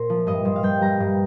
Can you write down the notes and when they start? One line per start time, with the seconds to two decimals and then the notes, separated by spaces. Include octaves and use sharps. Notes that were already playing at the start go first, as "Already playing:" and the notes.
Already playing: A#2 A#4 C5
0.10 F3
0.27 G2 D#5
0.45 G2 C5
0.56 F5
0.63 G2 G5
0.81 G3 A#5
1.00 G2